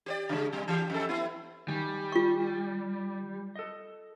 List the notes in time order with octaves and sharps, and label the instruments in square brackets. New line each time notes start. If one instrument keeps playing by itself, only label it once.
[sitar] G4 C5 D5
C#3 G#3
B2 G3
E3 G4
F2 A4
B3 E4
[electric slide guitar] D#3 G#5 [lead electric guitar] G3
[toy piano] F4 C#6
[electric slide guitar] A4 D#5